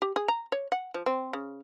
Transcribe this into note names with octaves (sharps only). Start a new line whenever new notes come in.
G4
G#4
A#5
C#5
F#5
F3
C4
C#3